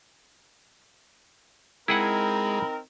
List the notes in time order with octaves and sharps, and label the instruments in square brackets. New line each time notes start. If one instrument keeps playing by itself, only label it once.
[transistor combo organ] G#3 [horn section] C4 D#4 A#4 [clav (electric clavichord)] E4 G#4 F#5 [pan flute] B5